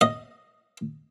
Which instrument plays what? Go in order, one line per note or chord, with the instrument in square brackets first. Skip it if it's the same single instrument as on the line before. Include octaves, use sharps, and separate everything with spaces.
[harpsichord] D#5